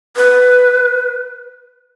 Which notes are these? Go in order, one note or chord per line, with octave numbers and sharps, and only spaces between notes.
B4